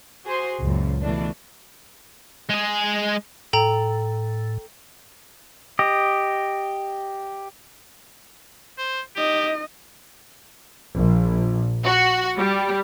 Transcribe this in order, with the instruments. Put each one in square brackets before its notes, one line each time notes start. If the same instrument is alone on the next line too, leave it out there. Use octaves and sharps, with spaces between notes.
[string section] F#4 G#4 C5 C6
C#2 F#2 A#2
B2 E3 A3 D4
[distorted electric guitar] G#3 G#4
[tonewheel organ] A2 [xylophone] A4 G5 A#5
[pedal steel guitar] G4 D#5
[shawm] C5
[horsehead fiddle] D#4 D#5 [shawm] G4
[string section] A#1
F#4
G3